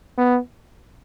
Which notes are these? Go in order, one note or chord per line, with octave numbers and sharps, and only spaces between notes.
B3